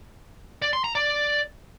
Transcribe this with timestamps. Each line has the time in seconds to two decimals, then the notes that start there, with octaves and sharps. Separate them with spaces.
0.62 D5
0.73 C6
0.84 A#5
0.95 D5